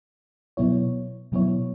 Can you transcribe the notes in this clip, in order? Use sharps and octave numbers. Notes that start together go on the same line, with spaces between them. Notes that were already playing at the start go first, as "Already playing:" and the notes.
B2 F#3 B3 E4 C#5
B2 F#3 B3 E4 C#5